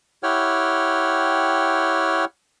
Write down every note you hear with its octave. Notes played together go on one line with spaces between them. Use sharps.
E4 G4 C#5 F#5 G5 F6